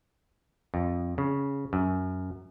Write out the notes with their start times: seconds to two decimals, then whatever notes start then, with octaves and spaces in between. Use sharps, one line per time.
0.74 F2
1.18 C#3
1.73 F#2